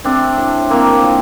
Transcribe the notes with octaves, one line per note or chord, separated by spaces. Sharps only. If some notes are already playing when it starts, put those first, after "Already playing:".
A3 C4 D4
A2
A2 A#3 C4
F3